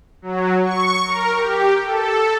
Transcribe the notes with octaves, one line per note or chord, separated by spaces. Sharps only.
F#3
C#6
A#4
G4
A4